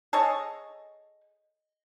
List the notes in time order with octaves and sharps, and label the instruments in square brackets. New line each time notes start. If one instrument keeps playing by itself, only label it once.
[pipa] G#4 A4 C#5 D#5